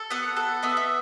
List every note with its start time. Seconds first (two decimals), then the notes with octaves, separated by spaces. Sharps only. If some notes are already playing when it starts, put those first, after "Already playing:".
Already playing: A4
0.10 B3 F#5
0.37 A4
0.63 B3 E5
0.77 E5